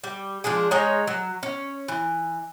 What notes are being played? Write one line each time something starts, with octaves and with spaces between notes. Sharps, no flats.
G3
F3 G#3 D4 G#4
G#3 D#4 C#5 A#5
F#3
C#4
E3